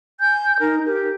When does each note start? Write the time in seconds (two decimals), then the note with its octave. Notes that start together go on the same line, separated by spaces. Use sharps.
0.20 G#5 G6
0.60 D#4 A#4
0.86 G4 A#4